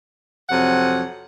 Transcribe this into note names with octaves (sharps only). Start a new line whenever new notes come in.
F2 C3 F#3 F#5